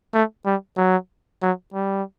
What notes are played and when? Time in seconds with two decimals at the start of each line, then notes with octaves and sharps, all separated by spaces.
0.14 A3
0.46 G3
0.77 F#3
1.42 F#3
1.74 G3